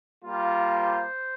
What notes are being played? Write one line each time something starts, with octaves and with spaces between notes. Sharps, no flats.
G3 A#3 F4
C5